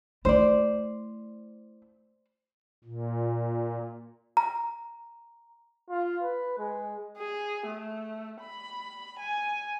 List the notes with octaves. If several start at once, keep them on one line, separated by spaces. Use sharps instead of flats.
A3 E4 C5 D5
A#2
A#5
F4
B4
G#3
G#4
A3
B5
G#5